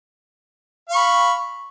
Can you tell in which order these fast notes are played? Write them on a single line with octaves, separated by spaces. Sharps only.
F5 C#6 B5